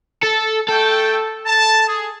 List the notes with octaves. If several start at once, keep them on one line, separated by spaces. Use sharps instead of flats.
A4
A3 A4 G5
A5
G#4